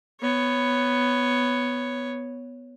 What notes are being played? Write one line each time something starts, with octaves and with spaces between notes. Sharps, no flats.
B3 C#5